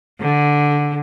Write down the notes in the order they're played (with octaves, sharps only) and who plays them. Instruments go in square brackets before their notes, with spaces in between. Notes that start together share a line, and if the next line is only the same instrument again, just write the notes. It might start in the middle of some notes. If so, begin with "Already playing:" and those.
[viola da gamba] D3